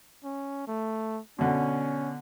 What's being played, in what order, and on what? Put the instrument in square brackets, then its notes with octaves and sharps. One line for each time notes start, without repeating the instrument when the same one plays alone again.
[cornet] C#4
A3
[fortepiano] B2 D3 [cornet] C#4